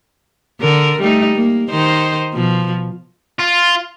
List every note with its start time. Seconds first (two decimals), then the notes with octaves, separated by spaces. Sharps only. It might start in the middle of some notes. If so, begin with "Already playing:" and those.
0.61 D3 A#4
1.01 G3 A3 D#4
1.35 A#3
1.70 D#3 D#4 C5
2.34 B2 F3
3.39 F4